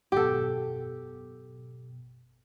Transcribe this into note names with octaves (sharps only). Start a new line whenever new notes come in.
G#1 F#2 B2 G4 A4